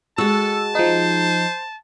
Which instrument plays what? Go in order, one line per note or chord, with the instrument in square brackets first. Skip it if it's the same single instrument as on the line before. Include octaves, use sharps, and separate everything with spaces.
[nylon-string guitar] G#3 F#4 [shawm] A4 [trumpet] A5 [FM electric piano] E6
[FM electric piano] F3 D#4 [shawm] C5